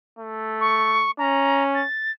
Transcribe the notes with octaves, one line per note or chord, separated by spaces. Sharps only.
A3
C#6
C#4 A#5
A6